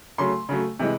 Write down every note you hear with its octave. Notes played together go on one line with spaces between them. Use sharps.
C#3 F#3 A3 C6
C#3 F#3 A3
C3 E3 G#3